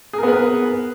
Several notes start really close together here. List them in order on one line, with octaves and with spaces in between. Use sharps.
G#4 A#4 B3 B4